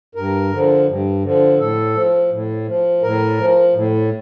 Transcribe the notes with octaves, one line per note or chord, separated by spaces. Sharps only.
G2 A#4
D3 F3
G2
D3 F3
A2 A4
F3
A2
F3
A2 A#4
F3
A2